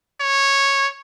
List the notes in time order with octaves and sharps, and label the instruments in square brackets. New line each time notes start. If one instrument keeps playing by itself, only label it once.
[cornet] C#5